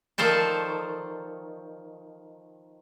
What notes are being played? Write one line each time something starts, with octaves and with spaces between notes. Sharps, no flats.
D#3 F3 A4 C5 D5